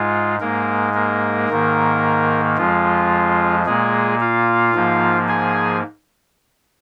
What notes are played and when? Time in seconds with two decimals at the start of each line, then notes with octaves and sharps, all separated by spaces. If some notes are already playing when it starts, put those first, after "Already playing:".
Already playing: G#2 G#3 F4
0.40 G#2 G#3 A#3 A#4
0.94 A#3 A#4
1.49 G#2 D#3 A#3
2.57 F2 F3 G#3 F4
3.66 A#2 G#3 A#3 G#4
4.20 F4 F5
4.74 G#2 F3 A#3
5.28 G#4 G#5